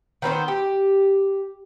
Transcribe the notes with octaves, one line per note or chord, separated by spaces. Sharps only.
D#3 B3 C4 C5
G4